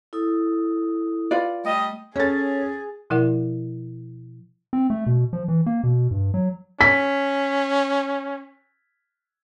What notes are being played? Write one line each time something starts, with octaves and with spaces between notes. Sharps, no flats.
E4 A4 D#6
F4 B4 D5
G3 A3 D#5
C#4 G#4 A4 C#5 A6
B2 F3 E4 A#4 D5 F#5
C4
A3
B2
F3
E3
A#3
B2
G2
F#3
C#4 B6